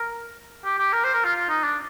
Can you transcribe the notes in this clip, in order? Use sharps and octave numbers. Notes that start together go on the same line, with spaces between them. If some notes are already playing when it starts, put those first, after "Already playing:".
Already playing: A#4
G4
G4
A#4
C5
A#4
F4
F4
D#4
D4